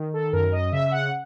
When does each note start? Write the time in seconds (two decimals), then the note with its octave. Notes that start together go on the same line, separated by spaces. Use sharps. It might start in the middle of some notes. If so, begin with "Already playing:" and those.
Already playing: D#3
0.14 A4
0.33 F#2 A#4
0.52 D#5
0.72 C#3 E5
0.91 F#5